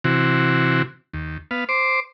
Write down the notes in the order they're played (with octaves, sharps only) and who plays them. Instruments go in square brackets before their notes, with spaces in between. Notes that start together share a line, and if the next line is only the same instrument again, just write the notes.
[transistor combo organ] C3 E3 F#4
D#2
B3 F5
C5 D6